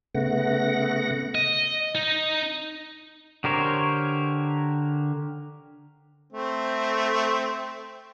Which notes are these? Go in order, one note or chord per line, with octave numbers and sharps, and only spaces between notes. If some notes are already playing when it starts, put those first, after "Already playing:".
C#3 A3 B3 F#5 A#6
D#5
D#4
D3 G4 A#4 C5 C#5
A3 C4